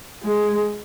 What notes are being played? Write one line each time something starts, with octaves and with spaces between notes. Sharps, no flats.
G#3